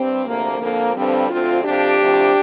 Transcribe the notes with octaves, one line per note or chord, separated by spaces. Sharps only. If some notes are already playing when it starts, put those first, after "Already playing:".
Already playing: G2 G3 C4
D2 C3 F3 A#3
F2 D3 F3 A#3
G2 D3 F3 G3 C4
D2 D3 F3 C4 F4
F2 C3 F3 D4 G4
D2 C3 F3